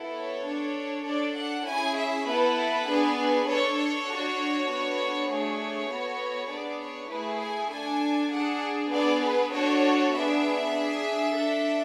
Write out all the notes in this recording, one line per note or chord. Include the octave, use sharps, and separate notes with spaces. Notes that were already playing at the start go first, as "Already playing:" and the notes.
Already playing: B3 E4 A4
C#5
D4 A4
D4 A4 D5
F#5
C#4 E4 G#4 G#5
E5
B3 E4 A4 B4
B3 D4 G#4
D4 A4 C#5
C#5
D4 F#4 A4
B3 D4 F#4 A4
A3 D4 G#4 C#5
B3 F#4 A4
B3 D4 G#4 D5
C#5
A3 E4 G#4 B4
G#5
D4 A4 G#5
D4 G#4 F#5
B3 D4 G#4 D5
B4
D4 F#4 A4 C#5
B3 D4 G#4 E5
D4 G#4
D4 A4